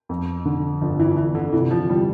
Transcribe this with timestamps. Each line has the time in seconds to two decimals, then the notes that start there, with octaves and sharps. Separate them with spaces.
0.09 F2
0.45 D3
0.81 G1 F3
1.00 E3
1.17 G1 E3
1.35 D3
1.53 C3 E3
1.71 F3
1.89 E3 G3